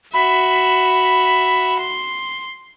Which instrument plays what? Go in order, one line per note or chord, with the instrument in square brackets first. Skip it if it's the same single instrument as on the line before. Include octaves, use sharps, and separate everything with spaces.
[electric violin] F#4 E5 [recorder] B5
[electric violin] C6